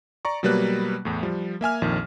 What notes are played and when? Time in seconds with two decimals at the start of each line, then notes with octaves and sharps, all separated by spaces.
0.25 D5 A#5 C#6
0.43 B2 F#3 G3 A#3 B4 F#6
1.05 E2 A2
1.23 F3 G3
1.61 A#3 E5 G#5 F6
1.82 A#1 F2 D#3